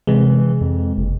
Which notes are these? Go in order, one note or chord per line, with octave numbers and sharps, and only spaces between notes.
C3 E3 G#3
F2
F#1